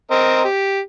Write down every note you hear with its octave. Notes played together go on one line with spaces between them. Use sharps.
C4 A#4 D#5
G4